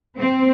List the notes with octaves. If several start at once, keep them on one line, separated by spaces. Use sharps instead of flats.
C4